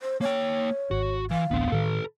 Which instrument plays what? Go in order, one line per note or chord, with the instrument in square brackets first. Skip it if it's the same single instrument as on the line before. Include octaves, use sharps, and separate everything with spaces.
[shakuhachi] C5
[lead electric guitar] A#3 G5 [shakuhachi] C#5
[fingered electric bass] G#1 [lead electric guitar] F#4
[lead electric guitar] E3 [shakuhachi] F5
[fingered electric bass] D1 A1 D4 [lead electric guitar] B3 C4
[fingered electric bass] A2 D#3 [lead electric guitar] A4 B4